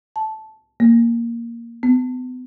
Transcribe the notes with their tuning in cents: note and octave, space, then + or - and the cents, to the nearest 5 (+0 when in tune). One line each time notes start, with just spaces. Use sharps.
A5 -10
A#3 +0
B3 +40